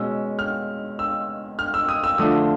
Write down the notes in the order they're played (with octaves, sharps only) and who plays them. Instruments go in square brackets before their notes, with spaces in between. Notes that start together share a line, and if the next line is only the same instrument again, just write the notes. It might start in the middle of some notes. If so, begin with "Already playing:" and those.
Already playing: [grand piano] B2 G#3 C#4 E6
F6
E6
F6
E6
D#6
E6
D3 F3 A3 D4 F4 D#6